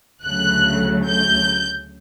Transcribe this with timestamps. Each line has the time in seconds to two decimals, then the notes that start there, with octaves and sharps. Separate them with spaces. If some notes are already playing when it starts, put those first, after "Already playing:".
0.24 D2 C#3 F#3 A3 F#6
1.08 G6